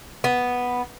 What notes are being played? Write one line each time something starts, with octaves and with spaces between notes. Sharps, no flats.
B3